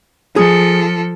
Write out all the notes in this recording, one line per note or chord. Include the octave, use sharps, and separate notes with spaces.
F3 G#4 A4